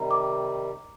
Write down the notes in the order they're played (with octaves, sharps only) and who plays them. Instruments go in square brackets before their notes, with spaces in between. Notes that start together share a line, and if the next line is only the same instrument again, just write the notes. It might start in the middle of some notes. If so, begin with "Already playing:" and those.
Already playing: [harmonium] C3 D#3 G3 [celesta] A#5
[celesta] D6